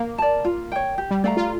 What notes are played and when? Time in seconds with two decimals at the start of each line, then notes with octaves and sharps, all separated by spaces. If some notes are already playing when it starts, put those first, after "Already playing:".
Already playing: A#3
0.18 D5 A5
0.45 F4
0.72 C#5 G5
0.98 G4
1.11 G3
1.24 A3 D5 F5 A#5
1.37 F4